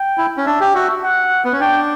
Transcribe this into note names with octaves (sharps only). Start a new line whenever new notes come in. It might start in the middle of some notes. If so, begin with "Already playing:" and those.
Already playing: G5
E4
C#4
D4 E5
G4
F#4 E5
F#5
B3
C#4
D4 G5